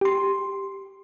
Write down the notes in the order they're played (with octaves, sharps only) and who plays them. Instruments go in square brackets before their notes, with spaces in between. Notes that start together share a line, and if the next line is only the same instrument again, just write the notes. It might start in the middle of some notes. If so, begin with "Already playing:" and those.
[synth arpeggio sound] G4 C6